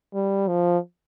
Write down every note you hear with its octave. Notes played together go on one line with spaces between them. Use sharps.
G3
F3